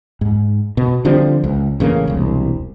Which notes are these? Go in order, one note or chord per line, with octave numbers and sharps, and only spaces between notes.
G#2
B2
D3 F3 G3 C4
C#2
A1 C#3 G#3 A#3
E1 C2